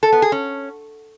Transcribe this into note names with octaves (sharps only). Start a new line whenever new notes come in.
A4
B3
G#4
C#4